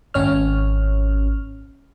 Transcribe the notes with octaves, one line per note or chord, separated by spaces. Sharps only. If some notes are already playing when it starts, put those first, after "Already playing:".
G#1 C#4 C#5 F6